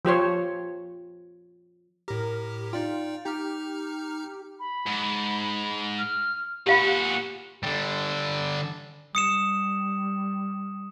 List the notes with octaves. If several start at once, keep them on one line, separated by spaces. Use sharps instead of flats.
F3 G4 C5 C#5
A2 G4 A#4
D#4 F4 D5 G5
D#4 G4 A#5 F6
B5
G#2
F6
A#2 F#4 G4 F5 F#5 B5
D3 G3
G3 D#6 C#7 E7